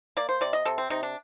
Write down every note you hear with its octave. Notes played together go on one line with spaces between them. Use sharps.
A#3 D5
C5
C3 D5
D#5
C3 A4
C4
C3 D#4
D4